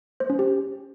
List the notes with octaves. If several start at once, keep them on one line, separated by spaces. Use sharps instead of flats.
C5
C#4
G4